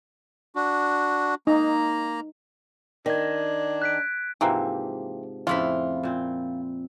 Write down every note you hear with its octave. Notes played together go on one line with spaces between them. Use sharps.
D4 F#4
A#3 D#4 A#5
D#3 D4 G#6 A#6
F#6 B6 D7
G#2 C3 E3 F3 A#3 C4
F2 A2 C#3 E4 F4 B5
A#2 C4